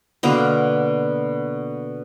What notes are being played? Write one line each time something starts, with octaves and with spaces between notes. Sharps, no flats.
B2 D3 A#3 B3